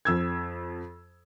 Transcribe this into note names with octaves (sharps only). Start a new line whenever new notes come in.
F2 E6 G#6